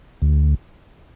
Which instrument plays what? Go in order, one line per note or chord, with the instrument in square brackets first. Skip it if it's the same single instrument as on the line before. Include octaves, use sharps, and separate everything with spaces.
[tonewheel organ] D2